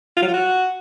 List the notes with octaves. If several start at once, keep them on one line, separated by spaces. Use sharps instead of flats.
F4
F#3
F4
F#4